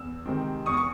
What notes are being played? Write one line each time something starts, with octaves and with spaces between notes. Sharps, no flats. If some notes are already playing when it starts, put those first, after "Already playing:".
Already playing: E2 E6
C3 D#3 G#3 C4
E2 C#6 D#6
C#6